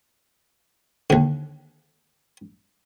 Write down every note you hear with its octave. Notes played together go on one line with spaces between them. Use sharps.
D#2 D3